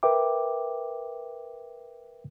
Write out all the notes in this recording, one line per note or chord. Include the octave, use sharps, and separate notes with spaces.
A#4 B4 E5 G5 D6